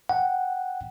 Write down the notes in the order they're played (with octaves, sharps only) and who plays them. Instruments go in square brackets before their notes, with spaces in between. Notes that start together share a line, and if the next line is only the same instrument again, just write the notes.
[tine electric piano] F#5 G5